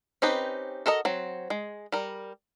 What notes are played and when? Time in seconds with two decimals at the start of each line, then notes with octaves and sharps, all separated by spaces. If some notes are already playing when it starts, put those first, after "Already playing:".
0.22 C4 C#4 D#4 G4 B4
0.86 F#4 A4 A#4 D#5
1.05 F#3 C4
1.50 G#3
1.92 G3 A#4